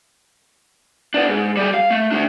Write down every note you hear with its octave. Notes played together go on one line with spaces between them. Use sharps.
B3 D4
G#2
G3 G#4
F5
A3
A3 D4